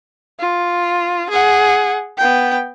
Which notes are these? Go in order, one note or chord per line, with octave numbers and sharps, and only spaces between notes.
F4
G#4 F#5
B3 G5